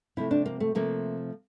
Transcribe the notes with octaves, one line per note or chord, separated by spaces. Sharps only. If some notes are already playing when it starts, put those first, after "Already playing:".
C3 F3 A3 E4
D4
A#3
A3
C3 F3 A3 A#3